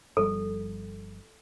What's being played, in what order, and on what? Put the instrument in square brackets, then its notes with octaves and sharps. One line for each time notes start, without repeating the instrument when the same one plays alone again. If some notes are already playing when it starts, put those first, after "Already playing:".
[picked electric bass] G1 F3 G3 [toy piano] A4